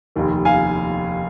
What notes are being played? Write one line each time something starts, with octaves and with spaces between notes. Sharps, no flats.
F1 D#2 D#3
F5 G#5